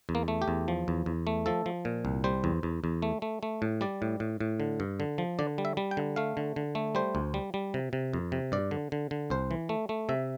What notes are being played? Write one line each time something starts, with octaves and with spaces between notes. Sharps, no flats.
E2
A#3
A3
G4
E2
F3
E2
E2
A3
F3 A4
F3
A#2
C2
G3 C5
E2
E2
E2
A3
A3
A3
A2
G3 D5
A2
A2
A2
D3
G2
D3
F3
D3 D5
G3
E5
G3
G5
D3
A3 F5
D3
D3
A3
G3 C5
D2
G3
G3
C3
C3
F2
C3
G2 D5
D3
D3
D3
C2 C5
E3
A3
A3
C3 E5